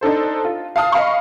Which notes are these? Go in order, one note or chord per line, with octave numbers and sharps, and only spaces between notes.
D4 D#4 A4 C5
F4
F5 A5 D#6 F6
D#5 F5 B5 C#6